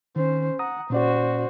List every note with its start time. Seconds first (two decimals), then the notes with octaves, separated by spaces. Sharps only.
0.16 D#3 C#4 C5
0.59 F#5 A#5 D#6
0.90 A#2 C#4 F#4 C5 D5